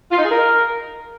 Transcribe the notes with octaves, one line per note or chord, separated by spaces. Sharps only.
F4
D#4
G#4
A#4